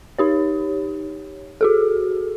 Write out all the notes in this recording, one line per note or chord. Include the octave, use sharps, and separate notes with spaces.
D#4 G4 C#5
F#4 G#4 A4